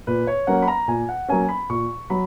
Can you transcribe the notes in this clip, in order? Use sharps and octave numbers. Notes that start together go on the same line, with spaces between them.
A#2 B4
C#5
F#3 A#3 C#4 F#5
B5
A#5
A#2 G#5
F#5
F#3 A#3 C#4 G#5
B5
A#2 C#6
F#3 B5